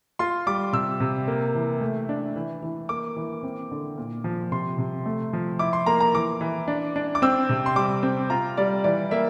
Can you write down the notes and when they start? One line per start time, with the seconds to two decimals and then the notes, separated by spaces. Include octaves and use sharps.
0.19 F4 C6
0.46 G3 D6
0.73 C3 E6
1.00 C3
1.28 A#3
1.55 E3
1.81 A3
2.09 D4
2.36 E3
2.63 E3
2.89 A#3 D6
3.17 E3
3.43 C4
3.71 D3
3.97 A#2
4.24 F3
4.51 C3 C6
4.78 C3
5.06 A3
5.33 F3
5.59 E4 D6
5.73 C6
5.86 A#3 A#5
6.00 A#5
6.14 E3 D6
6.41 E3
6.68 D4
6.96 D4
7.15 D6
7.22 C4 E6
7.49 C3
7.66 C6
7.76 G3 D6
8.03 C4
8.30 F4 A#5
8.57 G3 D5
8.84 E3 D5
9.11 A#3 E5